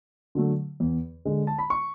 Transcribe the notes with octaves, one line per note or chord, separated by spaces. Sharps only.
D3 F#3 A3
E2
D3 G#3
A5
B5
C#6